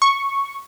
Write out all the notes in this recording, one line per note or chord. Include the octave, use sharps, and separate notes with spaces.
C#6